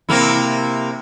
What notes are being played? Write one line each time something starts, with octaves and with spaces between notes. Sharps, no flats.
C3 A#3 E4